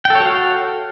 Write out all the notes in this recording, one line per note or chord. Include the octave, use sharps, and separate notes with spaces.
F#4 A4 C#5 F5 G5